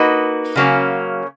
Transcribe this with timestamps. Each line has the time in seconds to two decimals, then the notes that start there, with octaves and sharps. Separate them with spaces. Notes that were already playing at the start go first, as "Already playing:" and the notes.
Already playing: A#3 D#4 F#4 B4
0.56 C#3 F#3 A#3 C#4